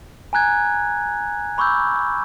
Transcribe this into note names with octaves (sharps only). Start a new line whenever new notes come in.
G#5 A#5 F#6 G#6
B5 C#6 D6 E6 G6